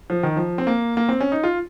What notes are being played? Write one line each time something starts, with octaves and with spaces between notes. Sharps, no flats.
F3
D#3
F3
C4
A#3
A#3
C4
C#4
D#4
F4